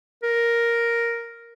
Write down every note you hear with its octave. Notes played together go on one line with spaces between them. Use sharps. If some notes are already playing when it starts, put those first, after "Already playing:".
A#4